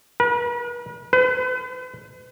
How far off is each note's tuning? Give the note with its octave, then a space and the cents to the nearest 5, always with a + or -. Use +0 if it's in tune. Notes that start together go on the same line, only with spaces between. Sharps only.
B4 -45
B4 +40